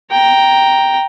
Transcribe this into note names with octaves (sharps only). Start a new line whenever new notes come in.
G5 A#5